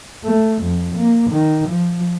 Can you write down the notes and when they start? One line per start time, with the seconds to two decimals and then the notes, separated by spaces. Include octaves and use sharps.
0.24 A3
0.62 F2
0.95 A#3
1.30 D#3
1.69 F3